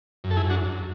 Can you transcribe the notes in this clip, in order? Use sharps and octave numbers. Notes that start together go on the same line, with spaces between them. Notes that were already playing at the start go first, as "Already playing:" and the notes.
F#2
A4
E4 G#4
F#2
D4 F#4
F#2